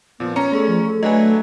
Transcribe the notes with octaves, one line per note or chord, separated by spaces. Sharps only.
A#2 F3 B3
B3 C#4 A#5 C#7
A3 G#4 A4 C#6
F3
A4
F#3 A3 D4 B4 D#5 G#5